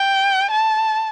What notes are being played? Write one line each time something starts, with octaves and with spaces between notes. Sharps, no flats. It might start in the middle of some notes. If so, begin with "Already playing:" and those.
Already playing: G5
A5